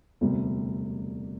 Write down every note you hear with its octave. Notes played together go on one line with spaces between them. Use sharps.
E1 D2 C3 G3